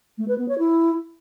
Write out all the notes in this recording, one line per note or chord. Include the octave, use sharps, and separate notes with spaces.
A3
B4
B3
C#5
E4